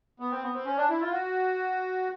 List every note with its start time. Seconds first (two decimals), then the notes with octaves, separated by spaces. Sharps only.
0.20 B3
0.31 C4
0.42 B3
0.54 C4
0.65 C#4
0.77 D4
0.89 E4
1.00 F4
1.12 F#4